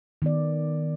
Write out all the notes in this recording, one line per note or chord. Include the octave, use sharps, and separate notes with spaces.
D#3 B3 D5